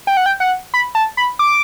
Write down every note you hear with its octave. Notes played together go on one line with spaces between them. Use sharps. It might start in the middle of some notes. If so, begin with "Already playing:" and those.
G5
F#5
G5
F#5
B5
A5
B5
D6